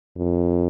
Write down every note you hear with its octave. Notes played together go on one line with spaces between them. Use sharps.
F2